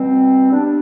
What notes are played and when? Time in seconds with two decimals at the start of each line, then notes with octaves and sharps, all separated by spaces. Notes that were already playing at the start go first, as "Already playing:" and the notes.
Already playing: B2 G3 C4
0.51 G3 B3 D4